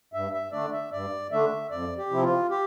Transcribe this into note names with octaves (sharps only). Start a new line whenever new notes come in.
G2 E5
E5
D3 A3 D4 D5
E5
G2 D5
D3 A3 D4 E5
F2 D5
G4
C3 F3 C4 E4
F4
G4